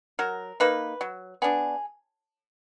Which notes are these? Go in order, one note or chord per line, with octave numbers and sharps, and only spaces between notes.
F#3 A#4
A#3 D#4 B4
F#3
B3 D4 G#4